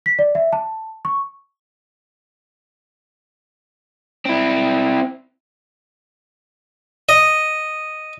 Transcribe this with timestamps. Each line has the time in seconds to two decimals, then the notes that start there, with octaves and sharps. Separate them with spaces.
0.06 B6
0.19 D5
0.35 E5
0.53 A5
1.05 C#6
4.26 C4 E4
7.09 D#5